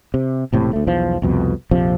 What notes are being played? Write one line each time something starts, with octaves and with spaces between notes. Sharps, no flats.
C3
E1 A2 C3
D2 A3
B1 E2 F3
C2 F2 B2
A#1 F2 C3 F3